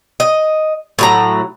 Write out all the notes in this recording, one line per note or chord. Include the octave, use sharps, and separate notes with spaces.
D#5
A2 F#3 A#5